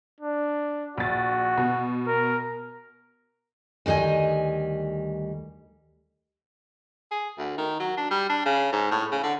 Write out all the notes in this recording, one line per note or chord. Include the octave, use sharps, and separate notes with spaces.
D4
A#1 F#4 A6
B2
A#4
D2 D#3 G3 D#5 G#5
G#4
D2
D#3
F#3
D4
G3
D4
C#3
G#2
A2
C#3
D3